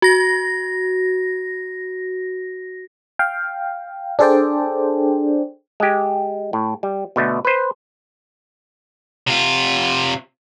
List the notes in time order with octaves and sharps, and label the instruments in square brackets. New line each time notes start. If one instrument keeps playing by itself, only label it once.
[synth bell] F#4 A#6
[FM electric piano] F5 G5
D4 G#4 A4 C5 D5 G5
[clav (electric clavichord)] G#3 G4
A2
G3
B2 D3 A3
B4 C5
[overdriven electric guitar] C3 F4